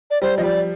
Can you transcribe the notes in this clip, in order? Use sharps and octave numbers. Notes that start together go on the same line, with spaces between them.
D5
G3 C5
F3 D#5
G3 D5